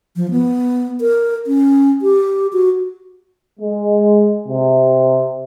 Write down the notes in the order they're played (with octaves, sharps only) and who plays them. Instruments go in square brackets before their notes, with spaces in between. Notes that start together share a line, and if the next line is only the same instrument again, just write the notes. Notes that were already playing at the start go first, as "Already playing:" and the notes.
[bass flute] F3
B3
A#4
C#4
G4
F#4
[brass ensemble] G#3
C3